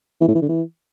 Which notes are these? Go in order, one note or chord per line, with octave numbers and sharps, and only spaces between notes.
E3
A2
E3
D3
E3